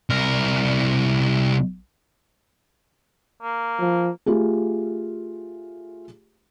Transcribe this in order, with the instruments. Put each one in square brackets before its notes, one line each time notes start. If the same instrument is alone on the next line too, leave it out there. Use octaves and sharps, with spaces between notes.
[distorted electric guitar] C2 A#4
[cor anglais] A#3
[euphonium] F3
[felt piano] A3 F4 G4 G#4